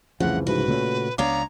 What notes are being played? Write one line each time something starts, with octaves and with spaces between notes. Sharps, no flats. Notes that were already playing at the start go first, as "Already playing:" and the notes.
C2 F2 A2 C#3 E3 F3 F#5
C2 G#2 C#3 F#4 B4
A#2 C#3 A3 C#4
C#2 F#3 B3 D4 C#5 F5 A#5 D6